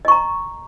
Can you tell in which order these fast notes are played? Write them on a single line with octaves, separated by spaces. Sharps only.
D#5 C#6 A#5